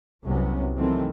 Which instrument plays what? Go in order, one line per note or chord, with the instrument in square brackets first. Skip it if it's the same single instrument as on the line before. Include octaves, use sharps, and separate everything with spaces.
[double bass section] C2 F2 C3 F#3 B3 C#4
C3 D#3 E3 F#3 A3 C4